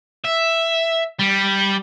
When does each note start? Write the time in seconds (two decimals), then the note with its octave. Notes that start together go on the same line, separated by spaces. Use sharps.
0.25 E5
1.19 G3